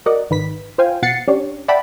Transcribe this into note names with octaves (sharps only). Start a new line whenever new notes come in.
F#4 A#4 D5 D#5 F#5
G#1 D#3 B4 B6
F4 C5 F5 G5 G#5
B2 F#5 A6 C7 C#7
C#4 D4 G4 C#5
D5 E5 F#5 G5 A5 B5